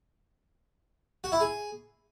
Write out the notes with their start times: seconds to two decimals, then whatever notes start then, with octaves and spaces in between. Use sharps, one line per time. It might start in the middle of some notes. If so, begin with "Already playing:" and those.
1.24 F#4
1.32 E4
1.40 G#4